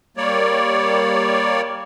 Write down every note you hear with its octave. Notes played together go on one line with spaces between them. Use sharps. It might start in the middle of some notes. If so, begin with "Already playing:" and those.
G3 A#3 C#5 D5